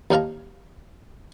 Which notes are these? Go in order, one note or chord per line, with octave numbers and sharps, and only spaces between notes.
D#2 D#4 C#5 F5 A5 A#5